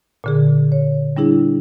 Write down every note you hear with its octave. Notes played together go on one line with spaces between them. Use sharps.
A#2 D3 G#4
C#5
G3 D4 E4 G#4